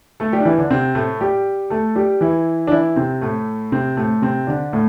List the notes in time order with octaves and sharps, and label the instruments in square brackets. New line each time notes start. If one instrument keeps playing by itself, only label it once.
[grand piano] A3 A4
G3 G4
D4
E3 E4
D3 D4
C3 C4
A2 A3
G3 G4
A3 A4
G3 G4
E3 E4
D4
E3 E4
C3 C4
A2 A3
C3 C4
A2 A3
C3 C4
D3 D4
A2 A3